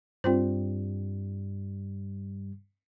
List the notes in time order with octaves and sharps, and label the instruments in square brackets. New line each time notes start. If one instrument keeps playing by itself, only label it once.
[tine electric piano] G2 G3 [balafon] C4 F4 C5